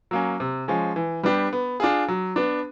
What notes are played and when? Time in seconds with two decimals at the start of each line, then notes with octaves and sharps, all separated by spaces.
0.11 F#3 A#3 C#4
0.40 C3
0.68 F3 G#3 C#4
0.96 E3
1.23 G3 B3 D4 G4
1.53 B3
1.80 D4 F4 G#4
2.08 F#3
2.36 B3 D4